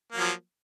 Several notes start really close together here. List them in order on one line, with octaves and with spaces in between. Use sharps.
A#3 F#3 F3